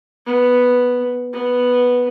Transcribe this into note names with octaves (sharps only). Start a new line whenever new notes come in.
B3
B3